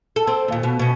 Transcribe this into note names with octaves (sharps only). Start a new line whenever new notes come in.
A4
C4
D#2 A#2
B2
B2 C#4